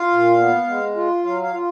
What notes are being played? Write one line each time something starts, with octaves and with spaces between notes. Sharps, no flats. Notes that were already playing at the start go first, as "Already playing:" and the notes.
Already playing: F4 F5
A#2
B3
G#3
F4
F#3 F5
F5
F4